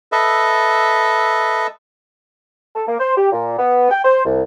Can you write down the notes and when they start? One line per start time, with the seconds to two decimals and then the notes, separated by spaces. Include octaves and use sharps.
0.12 A4 B4 D#5 E5
2.76 A4
2.88 A#3
3.00 C5
3.18 G4
3.32 A#2
3.59 B3
3.91 G5
4.05 C5
4.26 C2